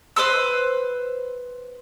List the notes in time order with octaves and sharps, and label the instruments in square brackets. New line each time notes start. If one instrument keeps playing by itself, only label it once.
[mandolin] B4 C5 C6 E6